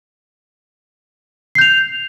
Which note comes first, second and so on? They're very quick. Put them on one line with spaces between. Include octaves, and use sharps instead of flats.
C7 G6 F7